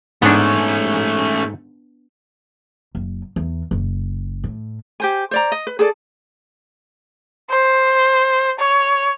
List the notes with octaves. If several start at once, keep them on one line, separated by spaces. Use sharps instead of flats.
G#2 A3 B3 C#4 D4
F#1
E2
F#1
A2
G4 C5 G#5
C5 D5 A#5
D#5
B4
G#4 A4 D5
C5
C#5